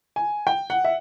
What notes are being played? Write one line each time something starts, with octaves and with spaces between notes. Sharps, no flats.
G#5
G5
F#5
E5